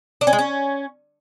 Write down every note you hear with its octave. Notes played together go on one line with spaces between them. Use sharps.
D4
C#4
G#3
C#4